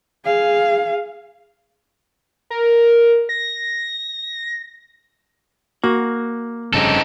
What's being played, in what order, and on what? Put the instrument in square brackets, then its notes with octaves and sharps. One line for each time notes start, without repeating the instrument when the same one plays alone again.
[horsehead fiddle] G#4 F5
[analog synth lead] A#4
A#6
[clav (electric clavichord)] A#3 [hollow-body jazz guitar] F#4
[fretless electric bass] F1 G2 C#3 [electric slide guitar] C4 D#4 A4